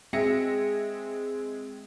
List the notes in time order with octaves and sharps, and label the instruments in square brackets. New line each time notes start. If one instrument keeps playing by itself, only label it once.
[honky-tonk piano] G#3 C4 G#4 E5 A#6 C#7